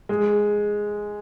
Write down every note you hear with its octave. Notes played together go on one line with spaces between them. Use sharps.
G#3